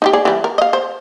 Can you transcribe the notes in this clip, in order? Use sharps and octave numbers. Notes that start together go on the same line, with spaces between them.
D#4 E4 G4
G#4 D5
E3 G3
A#4
D#5 F5
C5